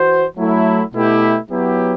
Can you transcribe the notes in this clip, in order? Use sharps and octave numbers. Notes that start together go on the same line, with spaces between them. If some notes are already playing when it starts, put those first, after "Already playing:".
Already playing: E3 F#4 C5
F#3 A3 E4 A4
B2 A3 E4 G4
F#3 B3 E4 G4